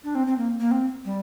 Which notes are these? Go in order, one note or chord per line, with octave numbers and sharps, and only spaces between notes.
D4
C4
C4
A#3
A#3
C4
G3